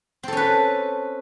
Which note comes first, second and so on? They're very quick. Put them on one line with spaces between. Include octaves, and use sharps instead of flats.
C4 A4 C#4 B4